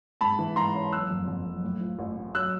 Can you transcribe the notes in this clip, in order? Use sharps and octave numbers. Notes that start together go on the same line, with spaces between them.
G#2 A5 B5
E3
G#2 A#5 C6
C#4
F#1 E6 F#6
F2
F2
F#1
A2
F3
A1
A2
F#3 E6 F#6